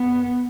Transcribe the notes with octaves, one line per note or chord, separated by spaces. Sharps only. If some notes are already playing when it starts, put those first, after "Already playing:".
Already playing: B3